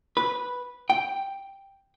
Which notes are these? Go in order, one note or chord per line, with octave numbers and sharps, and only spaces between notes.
B4
G5